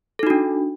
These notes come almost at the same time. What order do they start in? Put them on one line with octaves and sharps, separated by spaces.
A4 D#4 F#4 D4